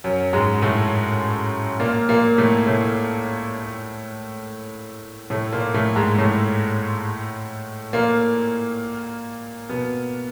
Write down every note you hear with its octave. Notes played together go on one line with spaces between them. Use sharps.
F#2 F#3
G#2 G#3
A2 A3
A#2 A#3
A#2 A#3
A2 A3
A2 A3
A2 A3
A#2 A#3
A2 A3
G#2 G#3
A2 A3
A#2 A#3
B2 B3